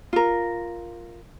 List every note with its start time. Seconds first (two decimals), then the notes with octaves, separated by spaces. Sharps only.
0.13 F4 A#4